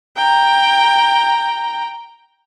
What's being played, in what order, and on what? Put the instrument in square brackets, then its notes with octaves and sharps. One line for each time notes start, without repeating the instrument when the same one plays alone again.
[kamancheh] G5 A#5